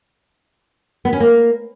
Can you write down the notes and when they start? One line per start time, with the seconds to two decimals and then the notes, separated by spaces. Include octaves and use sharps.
1.05 B3
1.13 C#4
1.20 A#3